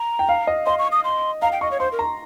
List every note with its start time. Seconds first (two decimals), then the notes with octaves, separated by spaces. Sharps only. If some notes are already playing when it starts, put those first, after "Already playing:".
Already playing: A#5
0.19 G5
0.29 F5
0.47 D#5
0.66 D#5 C6
0.79 C#6
0.92 D#6
1.04 C6
1.42 F5 A#5
1.52 G5
1.61 D#5 C#6
1.71 C#5
1.80 C5 C6
1.92 A#4
1.99 A#5